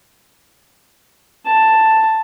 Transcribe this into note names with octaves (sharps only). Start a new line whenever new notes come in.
A5